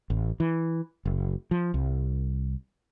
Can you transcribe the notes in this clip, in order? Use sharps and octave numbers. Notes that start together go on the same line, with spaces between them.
A1
E3
F#1
F3
C2